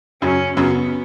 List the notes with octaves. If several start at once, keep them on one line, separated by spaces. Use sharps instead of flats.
F#2 C#3 F#3 C#4
F#2 C#3 F#3 B3